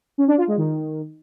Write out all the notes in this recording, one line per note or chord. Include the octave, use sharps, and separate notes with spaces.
C#4
D4
F4
G#3
D#3